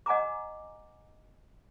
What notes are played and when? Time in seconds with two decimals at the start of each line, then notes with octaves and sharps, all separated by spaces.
0.06 D#5 F#5 G#5 A#5 D6